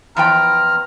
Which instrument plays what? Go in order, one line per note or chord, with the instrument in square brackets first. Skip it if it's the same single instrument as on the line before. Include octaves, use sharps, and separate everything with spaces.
[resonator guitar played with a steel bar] E2 F3 G5 [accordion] A#5 F6